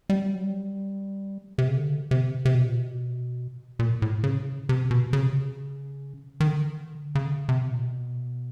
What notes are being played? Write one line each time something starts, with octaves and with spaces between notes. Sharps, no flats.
G3
F#3
G3
C3
C#3
D3
C3
C3
B2
A#2
B2
A#2
A2
C#3
C3
B2
C#3
C3
C#3
D#3
D3
C#3
D3
C#3
C3
A#2
B2